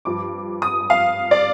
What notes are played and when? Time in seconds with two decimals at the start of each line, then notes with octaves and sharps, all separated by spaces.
0.05 G2 F3 D6
0.62 D#6
0.90 F5
1.31 D5